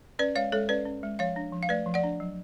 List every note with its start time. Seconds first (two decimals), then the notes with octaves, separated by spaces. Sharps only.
0.19 C#4 B4 D5
0.36 G#3 C#5 F5
0.52 G#3 A4 C#5
0.69 C#4 B4 D5
0.85 C#4
1.03 G#3
1.19 F3 C#5 F5
1.36 D4
1.52 F3
1.63 F5
1.69 A3 B4 D5
1.86 F3
1.94 D5 F#5
2.04 D4
2.20 F#3